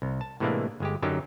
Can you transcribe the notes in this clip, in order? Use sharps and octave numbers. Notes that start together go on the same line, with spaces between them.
C2
A5
A2 C3 E3 G#3 A#3 D4
G1 G#3 G4
F#2 D3 F#3 D#4 G4 A#4